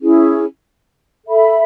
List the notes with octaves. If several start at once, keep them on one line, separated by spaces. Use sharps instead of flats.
C#4 E4 G#4
A4 E5 B5